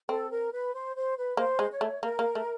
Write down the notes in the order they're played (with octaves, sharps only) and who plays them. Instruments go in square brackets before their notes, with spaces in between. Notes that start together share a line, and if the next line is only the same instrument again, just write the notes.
[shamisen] C4 [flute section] A4
[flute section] A#4
B4
C5
C5
B4
[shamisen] A#3 [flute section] C5
[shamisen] G#3
[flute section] C#5
[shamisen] A3
[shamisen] A#3 [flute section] A#4
[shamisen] A#3
A3